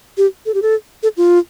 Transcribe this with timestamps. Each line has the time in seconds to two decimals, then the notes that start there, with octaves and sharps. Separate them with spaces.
0.18 G4
0.46 A4
0.54 G4
0.62 A4
1.03 A4
1.17 F4